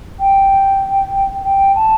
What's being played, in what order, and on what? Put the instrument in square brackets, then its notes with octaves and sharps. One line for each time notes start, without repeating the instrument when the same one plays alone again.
[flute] G5
G5
A5